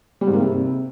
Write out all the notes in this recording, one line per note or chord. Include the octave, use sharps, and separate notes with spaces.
G3
G#2
A#3
C3